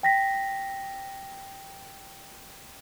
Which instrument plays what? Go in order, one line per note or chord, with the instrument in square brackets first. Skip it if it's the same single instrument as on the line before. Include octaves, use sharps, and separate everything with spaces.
[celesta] G5 A#6 B6